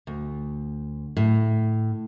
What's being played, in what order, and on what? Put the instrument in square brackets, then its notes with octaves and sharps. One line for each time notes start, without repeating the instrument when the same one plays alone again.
[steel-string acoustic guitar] D2
A2